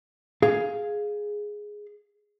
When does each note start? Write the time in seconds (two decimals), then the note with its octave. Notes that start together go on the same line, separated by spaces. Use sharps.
0.42 G#4 F5